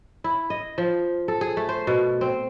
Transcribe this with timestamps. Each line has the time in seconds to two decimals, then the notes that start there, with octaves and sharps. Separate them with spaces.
0.24 E4
0.50 D#5
0.78 F3
1.28 A4
1.41 G#4
1.57 A3
1.69 C5
1.87 B2
2.21 C4